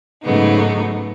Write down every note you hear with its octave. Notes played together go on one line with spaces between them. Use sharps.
G#2 C#3 F#3 A3 B3 D#4